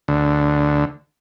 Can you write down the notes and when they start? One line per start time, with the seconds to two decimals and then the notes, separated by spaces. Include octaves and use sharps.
0.08 D2